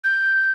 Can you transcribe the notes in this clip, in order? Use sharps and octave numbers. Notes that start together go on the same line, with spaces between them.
G6